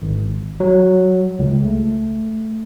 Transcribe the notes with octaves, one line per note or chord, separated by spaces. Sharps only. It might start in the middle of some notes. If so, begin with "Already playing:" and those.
G#1
F#3
C#2
A3